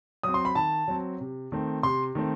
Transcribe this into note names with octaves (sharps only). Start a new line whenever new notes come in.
F#3 C4 D#6
C6
B5
D#3 A5
F#3 C4
C3
D#3 A3 C4
C3 C6
D#3 A3 C4